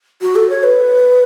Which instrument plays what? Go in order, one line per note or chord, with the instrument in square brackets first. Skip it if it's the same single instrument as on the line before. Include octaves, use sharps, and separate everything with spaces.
[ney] F#4
A4
C#5
B4